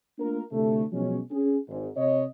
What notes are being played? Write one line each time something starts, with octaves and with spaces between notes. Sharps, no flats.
A3 A#3 D4 F4 A#4
D2 A2 C3 A3
B2 F3 F#3 G#3 C#4
C#4 G#4
G#1 G#2
C3 C#5 D#5